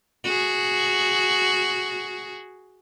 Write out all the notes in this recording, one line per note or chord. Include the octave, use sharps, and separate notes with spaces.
F#4 G#4